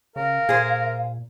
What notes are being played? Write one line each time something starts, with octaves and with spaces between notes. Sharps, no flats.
C#3 A#4 F5
A#2 G#4 C5